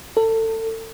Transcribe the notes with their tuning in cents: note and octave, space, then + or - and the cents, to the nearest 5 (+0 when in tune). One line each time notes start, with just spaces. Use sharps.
A4 +30